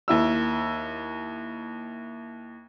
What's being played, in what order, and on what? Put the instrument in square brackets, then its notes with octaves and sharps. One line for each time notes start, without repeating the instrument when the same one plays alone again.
[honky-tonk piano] D#2 E4 E6